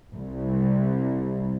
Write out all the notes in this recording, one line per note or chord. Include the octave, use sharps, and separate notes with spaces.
C2